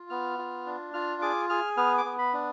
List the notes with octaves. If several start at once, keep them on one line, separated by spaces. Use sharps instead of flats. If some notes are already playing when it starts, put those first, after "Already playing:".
Already playing: F4
B3 F6
F4
D4
F4 F6
G#4 D6
G#4 F6
B3 F6
D6
B3
B5
D4